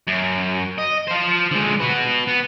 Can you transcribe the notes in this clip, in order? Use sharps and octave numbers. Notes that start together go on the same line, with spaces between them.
F#2
D#5
F4 C5
D3 G#3
F#4 B4
B3